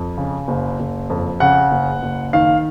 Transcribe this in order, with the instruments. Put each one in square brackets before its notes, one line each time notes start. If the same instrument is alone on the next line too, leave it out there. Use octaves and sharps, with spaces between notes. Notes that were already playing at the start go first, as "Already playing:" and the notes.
Already playing: [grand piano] F2
C#3
F#1
F#1
F2
C#3 F#5
F#1
F#1
D#3 F5